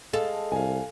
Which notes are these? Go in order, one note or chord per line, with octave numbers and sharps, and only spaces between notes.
G#3 A4 F5
C2 F5 G#5